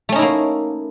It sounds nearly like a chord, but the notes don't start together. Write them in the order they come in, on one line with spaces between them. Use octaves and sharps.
A3 C#4 D#4 E4 A#3